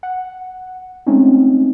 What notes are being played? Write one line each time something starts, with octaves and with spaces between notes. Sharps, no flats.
F#5
G#3 A3 C4 C#4 D#4